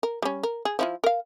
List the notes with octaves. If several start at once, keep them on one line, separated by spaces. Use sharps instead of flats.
A#4
G3 C#4
A#4
G#4
F3 E4 F4
A#4 F5